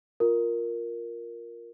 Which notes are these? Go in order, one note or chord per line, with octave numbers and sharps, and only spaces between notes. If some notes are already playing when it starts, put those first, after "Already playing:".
F4 A#4